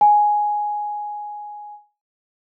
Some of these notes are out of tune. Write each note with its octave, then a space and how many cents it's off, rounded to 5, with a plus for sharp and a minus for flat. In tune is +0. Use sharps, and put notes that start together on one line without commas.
G#5 +5